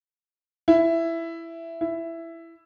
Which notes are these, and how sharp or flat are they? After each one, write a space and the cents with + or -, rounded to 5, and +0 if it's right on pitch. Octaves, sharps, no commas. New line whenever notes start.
E4 +10
E4 +10